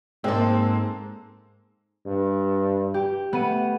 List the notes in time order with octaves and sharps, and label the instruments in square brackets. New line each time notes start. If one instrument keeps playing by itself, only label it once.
[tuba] G#2 [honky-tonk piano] G#3 A#3 [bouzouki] C4 A4
[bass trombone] G2
[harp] G4
[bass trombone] A3 [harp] B3 D#7